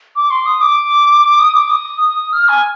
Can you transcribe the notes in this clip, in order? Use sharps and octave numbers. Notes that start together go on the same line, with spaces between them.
D6
C6
D#6
D6
D#6
D6
D#6
D#6
F6
G#5